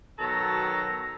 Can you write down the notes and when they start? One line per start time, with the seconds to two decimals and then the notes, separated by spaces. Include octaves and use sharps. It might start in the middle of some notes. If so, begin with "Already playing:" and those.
0.19 B2 D#3 F#3 A4 A#5